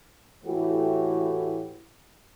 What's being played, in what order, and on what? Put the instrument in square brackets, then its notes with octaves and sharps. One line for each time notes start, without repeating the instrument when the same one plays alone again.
[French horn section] A2 E3 A3 E4 F#4 G4